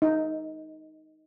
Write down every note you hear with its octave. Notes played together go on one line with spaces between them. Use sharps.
D#4